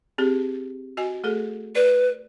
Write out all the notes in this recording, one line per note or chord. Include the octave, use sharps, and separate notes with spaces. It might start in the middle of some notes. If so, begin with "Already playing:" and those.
C4 G4 G#4
F#4 D#5 G#5
A3 G#4 A4
B4 D5